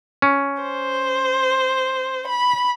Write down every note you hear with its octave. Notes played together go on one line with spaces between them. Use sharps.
C#4
C5
B5